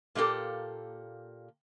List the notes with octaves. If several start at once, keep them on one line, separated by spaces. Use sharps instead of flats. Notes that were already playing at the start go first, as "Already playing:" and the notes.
A#2 A3 A#3 G4 A4